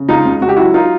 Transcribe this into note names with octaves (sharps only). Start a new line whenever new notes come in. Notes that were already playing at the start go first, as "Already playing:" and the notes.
Already playing: C#3
C#2 D#4 F4
C#2
C#2 F#4
G4
F#3 E4 F#4
D#4 F4